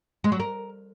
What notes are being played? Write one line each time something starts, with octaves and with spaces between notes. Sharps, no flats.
G#3
F#3
A#4